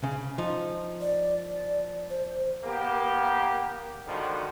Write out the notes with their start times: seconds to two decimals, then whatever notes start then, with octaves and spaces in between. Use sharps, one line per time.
0.03 C#3
0.38 F3 D#4
1.01 D5
2.10 C5
2.64 A#3 B3 G4
4.07 G#2 D3 D#3 F3 G3 F#4